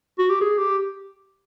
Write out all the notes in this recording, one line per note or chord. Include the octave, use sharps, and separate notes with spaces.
F#4
G4
G#4
G4